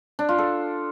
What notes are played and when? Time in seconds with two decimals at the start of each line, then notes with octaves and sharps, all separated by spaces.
0.19 D4
0.29 F4
0.38 A4